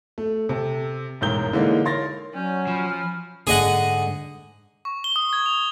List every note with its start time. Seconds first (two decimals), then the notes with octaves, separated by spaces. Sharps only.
0.18 A3
0.49 C3 A4
1.21 E1 A1 G#2 A#4 G6 G7
1.53 D3 E3 G#3 A#3 C#4 D#4
1.85 A#4 C#5 C6 A6 A#6
2.34 F#3 C#4 D5 G6
2.67 F3 G#5 B5 F6
3.47 G#2 D3 G#4 D#5 F#5
4.85 C#6
5.04 G7
5.16 D#6
5.33 G#6
5.46 F7